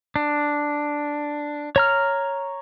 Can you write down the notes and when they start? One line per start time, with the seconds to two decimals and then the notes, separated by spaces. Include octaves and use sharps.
0.16 D4
1.76 C#5 A#5 F6